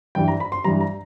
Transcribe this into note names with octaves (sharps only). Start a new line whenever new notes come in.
G2 E3 G3 G5
A#5
B5
C6
G2 E3 G3 A#5
A#5